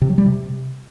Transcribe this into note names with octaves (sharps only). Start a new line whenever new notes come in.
C3
F#3
G3
C3